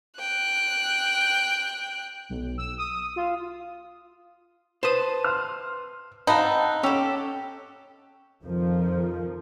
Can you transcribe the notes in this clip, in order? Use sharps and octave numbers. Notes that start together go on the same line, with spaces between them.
G5 F#6
B1
E6
D#6
F4
B4 C5 A5 D#6
C6 F6
C4 D#4 F5 F#5 A5 B5
C#4 G4 A4 E6
F2 D#3 F3